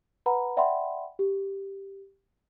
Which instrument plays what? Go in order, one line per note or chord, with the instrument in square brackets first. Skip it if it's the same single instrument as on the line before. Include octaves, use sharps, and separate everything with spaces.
[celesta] B4 F#5 A#5 B5
D5 E5 F#5 G5 B5 C6
G4